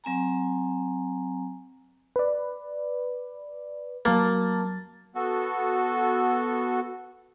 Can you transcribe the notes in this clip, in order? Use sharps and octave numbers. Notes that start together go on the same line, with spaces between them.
F#3 C4 G#5 A#5
B4 D5
F#3 A#3 A5 A6
B3 F#4 A4